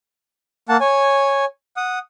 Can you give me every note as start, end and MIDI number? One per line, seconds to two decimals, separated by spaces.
0.69 0.77 58
0.69 0.77 78
0.69 0.77 81
0.81 1.45 73
0.81 1.45 80
1.77 1.99 78
1.77 1.99 87